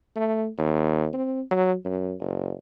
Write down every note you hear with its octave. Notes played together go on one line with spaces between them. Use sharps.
A3
D#2
C4
F#3
F#2
F#1